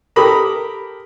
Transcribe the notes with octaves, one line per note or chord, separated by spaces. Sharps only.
G4 A4 A#4 A#5 B5 D#6